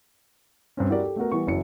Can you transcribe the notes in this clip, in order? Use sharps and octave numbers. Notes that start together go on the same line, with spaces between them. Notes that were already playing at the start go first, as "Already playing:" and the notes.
G2 C4 C#4
E4 F#4 G4 A#4 D5
G4 A4
A3 B3 F#4 A#4
E3 G3 B3 C#6
F#1 E3 F#4 C#7